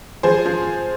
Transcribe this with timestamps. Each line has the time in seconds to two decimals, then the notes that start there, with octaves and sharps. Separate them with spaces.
0.23 F3 G#4 C5
0.46 F3